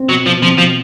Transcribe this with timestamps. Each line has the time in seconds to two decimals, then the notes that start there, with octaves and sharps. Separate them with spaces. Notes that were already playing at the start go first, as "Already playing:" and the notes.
Already playing: C4
0.09 B2 F#3
0.26 B2 F3
0.42 F3 C4
0.58 B2 F3